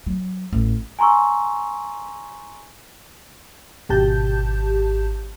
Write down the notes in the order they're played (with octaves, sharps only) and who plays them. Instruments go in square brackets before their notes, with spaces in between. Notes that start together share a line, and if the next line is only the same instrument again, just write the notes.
[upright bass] F#3
A1
[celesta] G#5 A#5 C6 C#6 E6
[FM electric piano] G#1 B2 G4 A5 G6